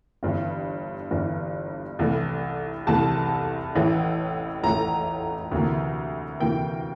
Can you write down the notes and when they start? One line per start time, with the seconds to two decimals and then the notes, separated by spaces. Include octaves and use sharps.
0.23 G1 G2 E3
1.11 G1 G2 E3
1.99 C2 C3 E3 A3
2.87 C2 C3 E3 A3 A5
3.75 A1 A2 E3 A3
4.63 A1 A2 E3 A3 A#5
5.51 D2 C3 E3 A#3
6.40 D2 C3 E3 A#3 G5